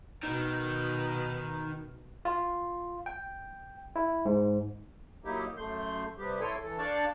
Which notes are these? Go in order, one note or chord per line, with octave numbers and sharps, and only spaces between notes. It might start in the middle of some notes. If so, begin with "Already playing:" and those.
B2 D#3
F4
G5
E4
G#2
F#3 A#3 D#4 E4 G4
F#2 A3 C6 G6
C3 G3 B3 G4
E4 A4 C#5 G5 G#5 C6
E3 A4
D4 D5 F5 G5 A5 C#6